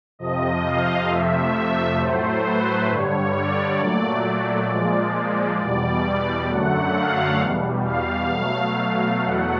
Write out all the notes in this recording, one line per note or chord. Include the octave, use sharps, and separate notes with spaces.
F2 C3 F3 D#5
F5
F2 C3 F3 A3 E5
A2 F#3 A3 C5
B4
G2 D3 G3 C#5
D5
A#2 F#3 A3
A#2 F3 G#3
E2 B2 G3 D5
F#2 D3 F#3 A3 F#5
F5
E2 B2 G3
F5
B2 F#3 A3
E2 B2 F#3 A3 F#5